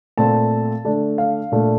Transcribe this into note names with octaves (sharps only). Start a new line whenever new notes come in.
A#2 A3 C4 A5
D3 A3 D4
F5
A#2 A3 D4